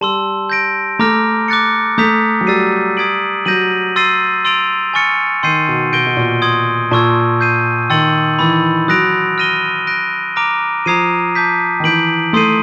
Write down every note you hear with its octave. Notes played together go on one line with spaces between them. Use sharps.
G3 A5 C6 E6
G6 A#6 D7
A3 A#5 D6 F6 A#6
D6 F#6 A6 C#7
A3 A#5 D#6 G6 B6
F#3
G3 E6 A6 C7 D#7
D#6 G#6 B6 D7 F#7
F#3 G6 A#6 D#7 F#7
C6 E6 A6 C7 D#7
C6 E6 A6 D7 F7
G#5 C#6 F6 A6 C#7
D#3 C6 E6 G6 C7 D#7
B2
B2 G6 A#6 D7 G7
B2
A#2
C6 D#6 G#6
A#2 A5 C#6 E6 G#6
G6 C7 D#7
D#3 C6 E6 A6 C#7 F#7
E3 B5 E6 A6
F#3 D#6 F#6 A#6 D7 F7
F6 A#6 D#7 G7
F#6 A#6 D7
A#5 D6 F6 A#6 D7
F3 A#5 D#6 G#6 C7 D#7
A5 D6 G6 B6
D#3
E3 G6 B6 D7 F#7
A3 C6 D#6 G6 C7 D#7